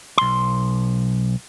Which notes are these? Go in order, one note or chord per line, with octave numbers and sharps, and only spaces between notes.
B1 C6